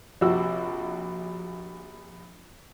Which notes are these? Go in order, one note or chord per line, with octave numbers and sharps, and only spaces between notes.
A#1 C3 F#4 E6